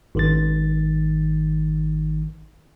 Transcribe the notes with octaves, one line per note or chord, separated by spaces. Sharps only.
G#1 D#3 A6